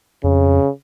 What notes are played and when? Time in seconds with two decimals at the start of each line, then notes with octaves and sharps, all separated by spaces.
0.24 F2 C#3